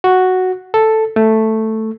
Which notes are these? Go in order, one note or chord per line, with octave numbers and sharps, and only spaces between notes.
F#4
A4
A3